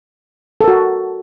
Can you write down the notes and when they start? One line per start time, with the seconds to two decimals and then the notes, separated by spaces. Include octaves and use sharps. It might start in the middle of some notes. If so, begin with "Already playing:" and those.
0.61 A4
0.64 A#4
0.68 F#4